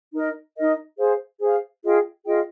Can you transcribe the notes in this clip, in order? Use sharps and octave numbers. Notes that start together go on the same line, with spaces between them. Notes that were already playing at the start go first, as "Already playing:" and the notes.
D#4 A#4 D#5
D#4 A#4 D#5
G#4 C5 F5
G#4 C5 F5
F4 G#4 D#5 G5
F4 G#4 D#5 G5